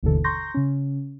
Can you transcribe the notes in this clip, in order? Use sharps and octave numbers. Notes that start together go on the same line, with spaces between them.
G1 D#2 B2 D3 E3 A4
A#5 C6 C#6 G6 A#6
C#3 C#4